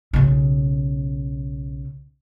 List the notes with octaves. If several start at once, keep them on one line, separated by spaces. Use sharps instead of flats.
B1 C#3